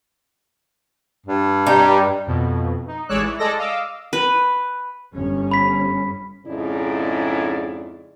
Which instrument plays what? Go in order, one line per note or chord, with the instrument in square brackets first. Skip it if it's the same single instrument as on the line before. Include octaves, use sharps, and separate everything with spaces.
[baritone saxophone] G2
[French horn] G3 [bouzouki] D#4 G4
[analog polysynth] F2 B2
D#4
A1 G#3 C#5 D5 E6 F#6
E3
G#3 A4 D5 D#5 A#6
D#5 F5 D6 E6
[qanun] B4
[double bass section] G1 C#4
[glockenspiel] B5 B6
[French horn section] F2 G#2 C#3 D#4 E4 D5